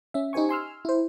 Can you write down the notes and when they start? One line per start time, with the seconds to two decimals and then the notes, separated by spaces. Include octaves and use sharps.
0.14 C#4 E5
0.33 D#4 G4 C5 G#5 C#6
0.49 G#5 C6 E6 F6
0.85 E4 C5